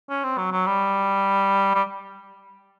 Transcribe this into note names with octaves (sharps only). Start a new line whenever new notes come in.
C#4
C4
F#3
F#3
G3
G3